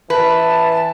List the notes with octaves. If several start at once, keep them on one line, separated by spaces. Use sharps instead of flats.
E3 B4 A5